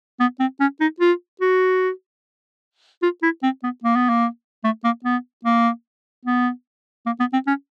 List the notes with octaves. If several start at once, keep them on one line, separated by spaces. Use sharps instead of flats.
B3
C4
C#4
D#4
F4
F#4
F4
E4
C4
B3
A#3
B3
A#3
A3
A#3
B3
A#3
B3
A#3
B3
C4
C#4